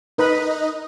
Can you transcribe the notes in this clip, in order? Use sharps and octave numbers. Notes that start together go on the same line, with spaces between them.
D#4 A#4 B4 D#5 B5